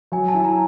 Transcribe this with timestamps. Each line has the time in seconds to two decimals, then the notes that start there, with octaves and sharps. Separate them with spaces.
0.12 F#3 G#5
0.29 A5
0.34 E4
0.45 A#5